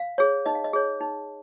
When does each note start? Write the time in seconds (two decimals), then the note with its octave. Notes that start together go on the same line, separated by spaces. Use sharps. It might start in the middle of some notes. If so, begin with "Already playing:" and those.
Already playing: F5
0.18 G#4 C#5
0.46 D#4 D#5
0.55 F5
0.64 D#5
0.73 G#4 C#5
1.00 D#4